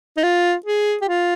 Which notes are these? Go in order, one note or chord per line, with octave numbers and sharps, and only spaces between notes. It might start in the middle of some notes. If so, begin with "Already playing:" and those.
D#4
F4
G#4
G4
F4